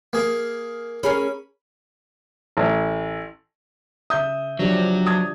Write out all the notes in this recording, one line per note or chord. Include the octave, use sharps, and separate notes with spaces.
A#3 G#4
C#4 G#4 A#4 B5
A1
C#3 E5 D#6 G6
F3 F#3 D4 G4
A5 D#6 G#6